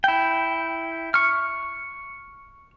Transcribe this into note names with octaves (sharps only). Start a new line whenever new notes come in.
E4 G5
C#6 F6